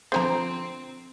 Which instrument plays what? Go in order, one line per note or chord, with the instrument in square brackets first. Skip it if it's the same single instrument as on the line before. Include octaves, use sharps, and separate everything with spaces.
[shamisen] D3 G4 A#5 [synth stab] F3 C5 [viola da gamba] C4